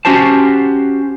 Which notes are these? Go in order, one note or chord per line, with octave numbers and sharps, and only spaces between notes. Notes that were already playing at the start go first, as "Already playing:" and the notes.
C#4 F#4 G4 C5 A5